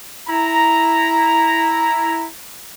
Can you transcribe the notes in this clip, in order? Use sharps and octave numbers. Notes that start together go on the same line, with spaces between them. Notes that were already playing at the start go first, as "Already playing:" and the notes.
E4 A#5